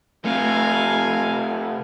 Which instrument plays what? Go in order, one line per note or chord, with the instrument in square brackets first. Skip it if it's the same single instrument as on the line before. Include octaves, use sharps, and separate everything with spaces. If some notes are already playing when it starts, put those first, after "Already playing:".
[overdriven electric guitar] C3 A3 [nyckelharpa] F5 G#5